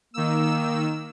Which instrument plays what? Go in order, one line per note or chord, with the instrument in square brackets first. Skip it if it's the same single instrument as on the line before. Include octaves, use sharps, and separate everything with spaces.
[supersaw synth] D#3 E6 [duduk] A#3